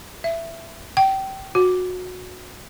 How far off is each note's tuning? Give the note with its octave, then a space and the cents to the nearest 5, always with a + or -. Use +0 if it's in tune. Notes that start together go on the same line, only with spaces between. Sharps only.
E5 +15
G5 -25
F#4 -20